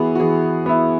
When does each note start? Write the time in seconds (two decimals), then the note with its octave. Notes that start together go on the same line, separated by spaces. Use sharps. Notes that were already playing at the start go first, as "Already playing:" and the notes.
Already playing: E3 B3 E4 F#4 G#4
0.15 F#4
0.20 E3 G#4
0.66 B3 E4